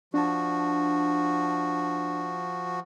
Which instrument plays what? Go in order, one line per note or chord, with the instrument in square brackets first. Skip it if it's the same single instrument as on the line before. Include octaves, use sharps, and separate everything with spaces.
[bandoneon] F3 F#4 [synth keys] D4 A5